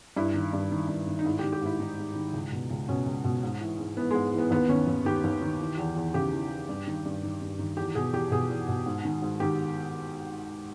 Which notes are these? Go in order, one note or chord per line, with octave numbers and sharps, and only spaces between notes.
G2 E4
D#3
G2
D#3
G2
D#3
D#4
G#2 E4
D#3 G4
G4
G#2 E4
D#3 D#4
G#2
D#3
C#2
B2
C#2
B2 C#4
C#2
B2
G#2
E3
G#2
E3 B3
G#2 G#3
E3
B3
D#2 B3
D#3 C#4
D#2
D#3 G4
D#2
D#3
E3
E2
E2
C#3 G4
E3
E2
G2
D#3
G2
D#3
G2
D#3
E2 G4
B2 G#4
E2 G4
B2 G#4
E2
B2
G#2
D#3
G#2
D#3 G4